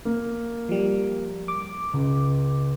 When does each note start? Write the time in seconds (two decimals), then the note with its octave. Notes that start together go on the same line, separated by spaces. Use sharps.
0.05 A#3
0.69 F3 G3
1.48 D6
1.93 C#2